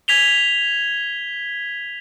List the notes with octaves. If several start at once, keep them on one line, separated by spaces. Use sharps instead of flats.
G#6 B6 F7 G7